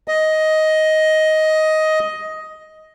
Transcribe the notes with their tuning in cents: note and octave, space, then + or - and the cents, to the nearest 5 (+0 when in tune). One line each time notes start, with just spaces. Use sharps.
D#5 +10